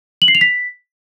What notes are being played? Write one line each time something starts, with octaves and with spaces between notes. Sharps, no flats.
F#7
C7
F7
B6